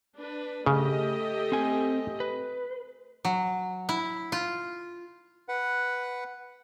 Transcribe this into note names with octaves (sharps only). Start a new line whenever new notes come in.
D4 B4
C#3 A3 G4 D#5
C4 G#5
B4
F#3
E4
F4
B4 F#5